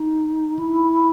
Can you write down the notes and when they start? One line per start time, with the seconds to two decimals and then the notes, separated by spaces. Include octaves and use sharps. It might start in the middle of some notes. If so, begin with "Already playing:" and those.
Already playing: D#4
0.59 E4